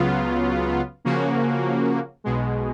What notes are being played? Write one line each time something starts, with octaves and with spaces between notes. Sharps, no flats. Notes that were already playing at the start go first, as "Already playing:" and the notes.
Already playing: C#2 C#3 F#3 B3 F4
C#3 F3 A#3 C#4 F#4
B1 B2 G#3